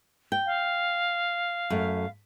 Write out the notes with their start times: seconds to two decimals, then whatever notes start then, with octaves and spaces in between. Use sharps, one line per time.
0.32 G5
0.46 F5
1.70 F#2 A3